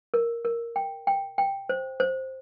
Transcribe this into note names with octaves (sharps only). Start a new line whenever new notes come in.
A#4
A#4
G5
G5
G5
C5
C5